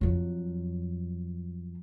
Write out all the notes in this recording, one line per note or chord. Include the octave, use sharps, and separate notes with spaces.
F2 F#3